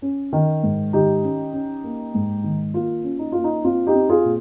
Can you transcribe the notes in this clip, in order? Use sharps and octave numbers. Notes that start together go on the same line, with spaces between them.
C#4
D#3
G#2
D#3 D#4 G4
C#4
C#4
A#3
G#2
D#3
A#3 F4
C#4
D#4
A#3 F4
D#4
C4 F4
D#4 G4
C4
F4 G#4
A#2